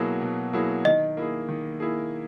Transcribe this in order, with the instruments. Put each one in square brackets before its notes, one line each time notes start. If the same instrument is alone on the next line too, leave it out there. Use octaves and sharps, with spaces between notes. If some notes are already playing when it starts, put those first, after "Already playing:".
Already playing: [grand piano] B2 F#3 A#3 E4 G#4
B2
F#3 A#3 E4 G#4
[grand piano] D#3 [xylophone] D#5
[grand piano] A#3 E4 G#4
D#3
A#3 E4 G#4